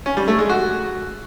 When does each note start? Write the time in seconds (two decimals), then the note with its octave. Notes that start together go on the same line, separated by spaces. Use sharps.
0.06 C#4
0.17 G3
0.28 A3
0.39 G#3
0.49 F#4